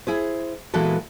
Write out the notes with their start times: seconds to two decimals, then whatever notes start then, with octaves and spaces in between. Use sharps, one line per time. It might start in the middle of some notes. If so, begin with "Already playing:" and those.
0.07 E4 G#4 C5
0.74 A#2 E3 G#3 B3 F#4 A4